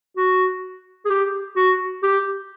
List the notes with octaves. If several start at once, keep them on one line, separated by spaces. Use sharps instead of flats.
F#4
G#4
G4
F#4
G4